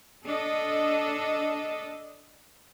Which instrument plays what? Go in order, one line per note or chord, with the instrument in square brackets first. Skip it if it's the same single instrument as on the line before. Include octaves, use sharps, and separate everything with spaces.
[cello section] D4 A4 D#5